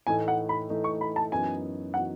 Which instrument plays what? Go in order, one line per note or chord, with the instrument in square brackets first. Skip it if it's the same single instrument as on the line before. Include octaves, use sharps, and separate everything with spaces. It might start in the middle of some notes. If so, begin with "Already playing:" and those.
[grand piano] A2 E3 A3 D#4 [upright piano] G#5
[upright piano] F#5
B5
[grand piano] A2 E3 A3 D#4
[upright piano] C#6
B5
A5
[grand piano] F#2 E3 B3 D#4 F#4 [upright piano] G#5
[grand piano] E3 B3 D#4 F#4 [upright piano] F#5